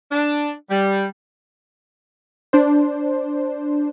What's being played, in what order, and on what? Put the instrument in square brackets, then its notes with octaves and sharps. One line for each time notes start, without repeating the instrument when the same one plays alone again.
[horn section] D4
G3
[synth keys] D4 C5